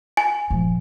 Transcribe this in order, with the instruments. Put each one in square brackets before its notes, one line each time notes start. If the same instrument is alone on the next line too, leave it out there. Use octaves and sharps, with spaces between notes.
[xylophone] G#5
[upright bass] A#2 F3